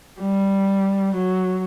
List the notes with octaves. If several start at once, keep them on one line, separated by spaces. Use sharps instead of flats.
G3
F#3